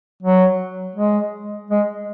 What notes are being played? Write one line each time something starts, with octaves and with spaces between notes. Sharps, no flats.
F#3
G#3
G#3